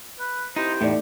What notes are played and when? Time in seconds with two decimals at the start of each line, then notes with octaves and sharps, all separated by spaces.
0.19 B4
0.56 D#4 E4 G4 C5
0.81 E2 A2 A3 D#4 D5